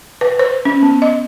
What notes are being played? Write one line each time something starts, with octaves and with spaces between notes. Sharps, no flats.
B4
C5
C#4
B3
D#5